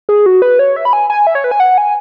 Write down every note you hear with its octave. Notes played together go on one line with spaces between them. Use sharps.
G#4
F#4
B4
C#5
E5
B5
G#5
G#5
E5
C#5
B4
G#5
F#5
G#5